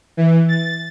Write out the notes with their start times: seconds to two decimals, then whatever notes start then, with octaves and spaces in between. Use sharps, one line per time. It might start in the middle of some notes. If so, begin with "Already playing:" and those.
0.17 E3
0.49 A6